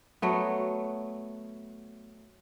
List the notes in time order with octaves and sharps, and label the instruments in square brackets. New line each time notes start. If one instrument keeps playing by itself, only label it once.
[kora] F#3 A3 B3